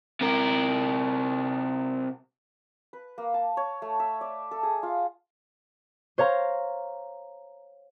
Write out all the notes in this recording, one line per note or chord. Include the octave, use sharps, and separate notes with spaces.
C3 A#4
B4
A#3
A5
C#5
A3
E5
D5
A4
G#4
F4
C5 C#5 F5 A#5